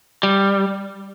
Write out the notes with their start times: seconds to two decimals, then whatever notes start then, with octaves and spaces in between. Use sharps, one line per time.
0.23 G3